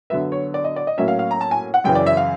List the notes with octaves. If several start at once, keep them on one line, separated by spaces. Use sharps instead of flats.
D3 F#3 B3 E5
C#5
D5
D#5
D5
D#5
A2 F#3 A#3 C#4 E5
F5
F5
A#5
A5
G#5
F#5
F#2 C#3 E3 G5
D5
E5
F5